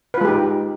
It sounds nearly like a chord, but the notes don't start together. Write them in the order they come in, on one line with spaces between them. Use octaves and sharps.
B4 F4 G#3 G4 D#4